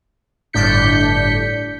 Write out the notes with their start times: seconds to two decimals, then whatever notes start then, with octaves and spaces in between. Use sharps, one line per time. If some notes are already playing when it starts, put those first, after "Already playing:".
0.53 G1 A2 D4 G6 B6 C#7